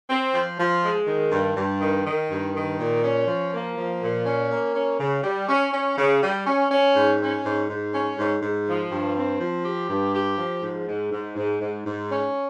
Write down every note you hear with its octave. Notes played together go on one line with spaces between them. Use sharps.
C4
F3
F3
G#3
D#3
G2
G2
D#3
D#3
G2
D#3
A#2
C#4
F3
A#3
F3
A#2
C#4
A#3
C#4
C#3
G3
C#4
C#4
C#3
G3
C#4
C#4
G#2
C#4
G#2
G#2
C#4
G#2
G#2
F3
G2
C4
F3
G4
G2
G4
F3
G#2
G#2
G#2
G#2
G#2
G#2
C#4